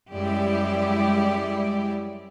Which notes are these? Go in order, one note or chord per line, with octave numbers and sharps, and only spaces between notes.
F#2 G3 G#3 E4 G4 D5